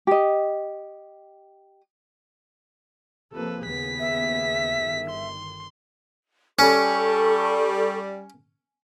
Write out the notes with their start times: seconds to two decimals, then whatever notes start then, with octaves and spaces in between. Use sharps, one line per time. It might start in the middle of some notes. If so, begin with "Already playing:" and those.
0.07 G4 D#5
3.33 C3 F3 A#3 A4 B4
3.65 D#2 C#3 B3 G#4 B6
4.00 E5
4.79 G1 D#3
5.10 C6
6.59 G3 C#4 A4 C#6